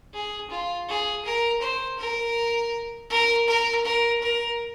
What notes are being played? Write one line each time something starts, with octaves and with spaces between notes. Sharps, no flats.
G#4
F4
G#4
A#4
C5
A#4
A#4
A#4
A#4
A#4